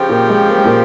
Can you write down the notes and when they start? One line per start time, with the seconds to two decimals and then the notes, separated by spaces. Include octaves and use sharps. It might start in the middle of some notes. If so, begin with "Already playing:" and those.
Already playing: C#3 F3 C4 G4
0.09 A#2 A#3
0.29 G#3
0.48 A#3
0.58 G#3
0.65 A#2 A#3